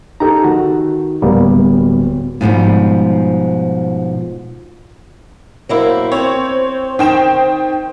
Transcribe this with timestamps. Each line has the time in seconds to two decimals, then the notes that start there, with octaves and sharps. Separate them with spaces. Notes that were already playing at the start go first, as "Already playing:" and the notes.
0.20 D#4 G4 A4 A#5
0.44 D#3 F#4
1.22 D1 G3 A#3 B3
2.41 G#2 B2 F3 G3
5.69 F#3 A#3 E4 C5
6.12 C4 C#5
6.99 D#3 G5 E7